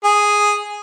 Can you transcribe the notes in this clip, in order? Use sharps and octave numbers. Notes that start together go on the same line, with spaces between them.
G#4